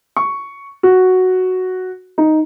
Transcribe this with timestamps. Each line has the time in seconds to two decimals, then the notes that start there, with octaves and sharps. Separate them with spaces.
0.17 C#6
0.83 F#4
2.18 D#4